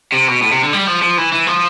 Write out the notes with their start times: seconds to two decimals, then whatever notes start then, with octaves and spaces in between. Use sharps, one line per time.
0.12 C3
0.28 B2
0.42 A2
0.52 C3
0.63 D3
0.73 G3
0.87 F3
1.02 F3
1.18 E3
1.32 E3
1.47 F3